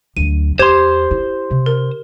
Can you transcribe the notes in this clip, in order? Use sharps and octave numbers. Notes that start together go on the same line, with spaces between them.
D2 F#3 D#7
E2 G4 C5 C6 G#6
E4
C3
A#4